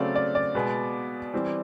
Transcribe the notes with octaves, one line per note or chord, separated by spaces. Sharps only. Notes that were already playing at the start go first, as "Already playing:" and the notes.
Already playing: C#3 F#3 A3 C4 D5
D5
D5
B2 G#3 B3
E3 G3 C4